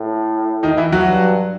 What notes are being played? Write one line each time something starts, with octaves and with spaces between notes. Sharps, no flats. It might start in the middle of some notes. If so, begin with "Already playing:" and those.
Already playing: A2
D#3 D#4
E3 E4
F#3 F#4
G2